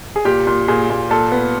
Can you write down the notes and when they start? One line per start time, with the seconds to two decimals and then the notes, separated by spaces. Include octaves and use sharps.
0.16 G#4
0.25 A#2 G4
0.47 A#2
0.68 A#2 G#4
0.90 A#2
1.10 A#2 A4
1.32 B3